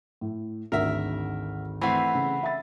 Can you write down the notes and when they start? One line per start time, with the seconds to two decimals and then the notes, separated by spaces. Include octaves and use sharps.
0.21 A2
0.72 G#1 D2 A#4 E5
1.82 E3 A3 C4 F#5 B5
2.15 C#3
2.43 E5 B5 A6